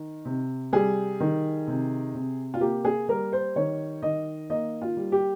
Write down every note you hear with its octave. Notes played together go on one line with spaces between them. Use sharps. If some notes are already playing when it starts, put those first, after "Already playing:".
Already playing: D#3
C3
G3 G#4
D#3
C3
C3
F4
A#3 G4
G#4
G3 A#4
C5
D#3 C#5
D#3 D#5
A#3 D#5
F4
G3
G4